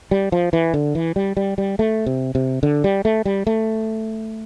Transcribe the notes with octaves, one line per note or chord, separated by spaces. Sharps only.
G3
F3
E3
D3
E3
G3
G3
G3
A3
C3
C3
D3
G3
A3
G3
A3